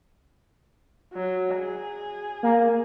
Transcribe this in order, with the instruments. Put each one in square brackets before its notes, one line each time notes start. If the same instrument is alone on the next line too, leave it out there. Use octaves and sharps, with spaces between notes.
[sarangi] F#3
G#4
[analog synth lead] A#3